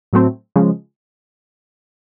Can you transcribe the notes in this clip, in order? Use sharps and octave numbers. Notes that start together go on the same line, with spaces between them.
A2 F#3 A3 C4
C#3 F3 G#3